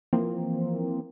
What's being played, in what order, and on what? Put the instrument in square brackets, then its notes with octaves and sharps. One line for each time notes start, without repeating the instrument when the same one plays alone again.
[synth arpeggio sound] E3 F3 A#3 C4